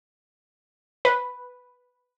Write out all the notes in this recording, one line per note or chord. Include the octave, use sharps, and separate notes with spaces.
B4